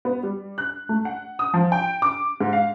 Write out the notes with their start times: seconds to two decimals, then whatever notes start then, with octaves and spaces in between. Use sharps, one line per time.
0.05 B3
0.23 G3
0.58 F#6
0.89 A3
1.05 F#5
1.39 D#6
1.54 F3
1.72 G5
2.02 D6
2.41 G#2
2.53 F5